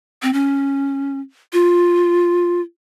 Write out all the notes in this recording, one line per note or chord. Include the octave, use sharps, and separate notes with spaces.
C4
C#4
F4